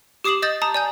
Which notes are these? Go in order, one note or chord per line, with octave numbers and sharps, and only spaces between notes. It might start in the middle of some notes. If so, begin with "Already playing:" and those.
G4 D6 D#6 C7 E7 F#7
D#5 D#6 G6 A6
A5 A#5 D#6
D5 G#5 G6